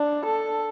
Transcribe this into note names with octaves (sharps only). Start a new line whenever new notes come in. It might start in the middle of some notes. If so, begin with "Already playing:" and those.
Already playing: D4
A4